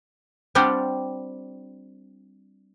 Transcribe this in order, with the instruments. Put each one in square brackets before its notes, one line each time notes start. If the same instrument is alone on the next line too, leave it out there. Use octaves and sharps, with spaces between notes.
[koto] G3 C4 D4 F4 G4 F#5